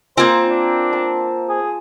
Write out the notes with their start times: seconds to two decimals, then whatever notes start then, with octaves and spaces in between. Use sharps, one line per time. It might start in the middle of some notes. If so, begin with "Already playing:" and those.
0.17 A#3 C4 F4 C5 G#5 D6
0.49 D4
0.93 A5
1.49 G#4